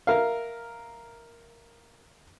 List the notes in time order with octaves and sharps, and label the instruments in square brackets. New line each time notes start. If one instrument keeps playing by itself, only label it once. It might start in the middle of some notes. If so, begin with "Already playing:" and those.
[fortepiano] A#4 E5 F5